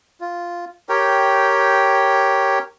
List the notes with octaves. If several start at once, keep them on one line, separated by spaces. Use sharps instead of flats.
F4
G4 A#4 C#5 G5